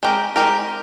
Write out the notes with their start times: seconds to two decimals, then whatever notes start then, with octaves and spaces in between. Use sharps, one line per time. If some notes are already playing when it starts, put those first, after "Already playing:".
0.03 G#3 C4 G4 A#4
0.36 G#3 C4 G4 A#4